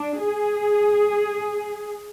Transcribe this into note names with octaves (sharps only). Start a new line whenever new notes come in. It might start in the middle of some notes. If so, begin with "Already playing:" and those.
Already playing: D4
G#4